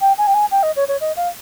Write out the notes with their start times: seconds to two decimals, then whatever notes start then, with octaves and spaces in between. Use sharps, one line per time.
0.01 G5
0.18 G#5
0.27 G5
0.34 G#5
0.51 G5
0.63 D#5
0.76 C#5
0.88 C#5
1.01 D#5
1.17 F5